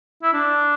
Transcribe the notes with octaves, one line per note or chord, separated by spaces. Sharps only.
E4
D4